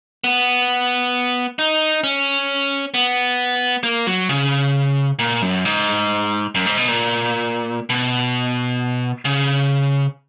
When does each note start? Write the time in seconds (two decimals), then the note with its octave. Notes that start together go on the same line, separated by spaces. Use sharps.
0.24 B3
1.59 D#4
2.04 C#4
2.94 B3
3.84 A#3
4.07 F#3
4.29 C#3
5.19 A#2
5.42 F#2
5.65 G#2
6.55 F#2
6.66 G#2
6.77 B2
6.88 A#2
7.90 B2
9.25 C#3